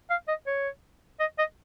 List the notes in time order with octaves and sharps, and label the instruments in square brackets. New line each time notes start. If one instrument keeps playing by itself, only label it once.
[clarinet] F5
D#5
C#5
D#5
D#5